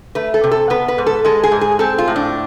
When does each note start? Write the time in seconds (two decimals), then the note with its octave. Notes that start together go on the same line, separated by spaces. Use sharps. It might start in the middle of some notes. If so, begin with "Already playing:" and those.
0.15 A3 B4
0.34 A4
0.44 C3
0.51 A4
0.70 B3 B4
0.88 B4
0.98 G#2
1.07 A4
1.25 G#3 A4
1.44 G#4
1.52 G#2
1.61 G#4
1.79 C4 A4
1.98 F4
2.08 A2
2.16 D4